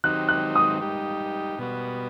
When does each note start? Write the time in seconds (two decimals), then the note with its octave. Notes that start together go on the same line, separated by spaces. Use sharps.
0.04 D#3 F#3 C4 D#4 G4 F#6
0.29 F#6
0.55 D#6
0.81 G3 D#4 G4
1.58 B2 G3 B3 F#4